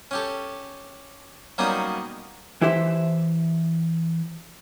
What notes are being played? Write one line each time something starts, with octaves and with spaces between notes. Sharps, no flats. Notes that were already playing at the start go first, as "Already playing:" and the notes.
C#4 G4 A4
F#3 G3 A#3 B3 C#4 D#4
E3 E4 G4 C5 E5